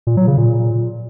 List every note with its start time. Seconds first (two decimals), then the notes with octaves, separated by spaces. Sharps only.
0.07 A#2
0.17 F#3
0.27 C#3
0.37 A#2